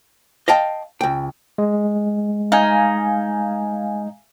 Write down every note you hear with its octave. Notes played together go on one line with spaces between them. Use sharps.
D#5 F5 G5 A5
C#2 G5
G#3
D#4 F5 G#5